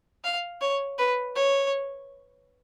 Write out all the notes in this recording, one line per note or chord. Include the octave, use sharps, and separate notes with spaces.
F5
C#5
B4
C#5